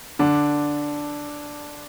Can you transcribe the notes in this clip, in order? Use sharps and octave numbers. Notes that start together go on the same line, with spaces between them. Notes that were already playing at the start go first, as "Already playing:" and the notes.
D3 D4